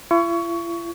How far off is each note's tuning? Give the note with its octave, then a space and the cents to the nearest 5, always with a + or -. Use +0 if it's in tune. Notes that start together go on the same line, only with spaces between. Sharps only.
E4 +45 C#6 +20